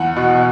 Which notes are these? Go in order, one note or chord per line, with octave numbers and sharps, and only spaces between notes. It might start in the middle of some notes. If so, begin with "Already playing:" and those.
Already playing: E2 F#5
B2